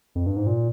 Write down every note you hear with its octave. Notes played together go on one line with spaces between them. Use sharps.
F2
G2
G#2
A#2